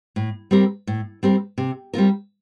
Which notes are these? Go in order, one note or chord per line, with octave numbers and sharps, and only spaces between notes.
A2
G3 C4 G4 A#4
A2
G3 C4 G4 A#4
C3
G3 C4 F4 A#4